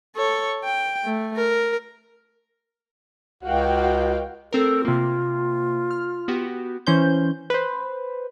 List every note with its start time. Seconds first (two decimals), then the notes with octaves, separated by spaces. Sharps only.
0.16 A4 C#5
0.65 G5
1.04 A3
1.37 A#4
3.43 C#2 F#4 F5 G5
4.53 A3 C4 A4 A#4
4.85 C3 A#3 F4
5.91 F6
6.28 B3 F#4 G4
6.87 E3 C#4 C5 G6
7.50 B4 C5